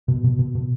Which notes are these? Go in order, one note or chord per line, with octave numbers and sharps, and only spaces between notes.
B2
B2
B2
B2